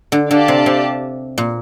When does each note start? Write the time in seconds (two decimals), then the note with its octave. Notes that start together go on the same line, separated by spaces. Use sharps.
0.12 D3
0.30 D3 G4 D5 F5 A5
0.48 C3
0.66 C3
1.38 A#2